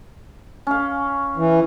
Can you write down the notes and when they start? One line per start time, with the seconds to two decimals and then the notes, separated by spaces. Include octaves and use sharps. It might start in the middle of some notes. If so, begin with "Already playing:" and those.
0.67 C#4 F5
1.37 E3